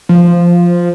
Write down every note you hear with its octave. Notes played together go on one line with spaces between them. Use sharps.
F3